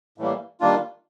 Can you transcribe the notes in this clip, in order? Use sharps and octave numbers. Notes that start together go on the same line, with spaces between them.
A2 E3 G3 A#3
D#3 G3 A#3 D4 F4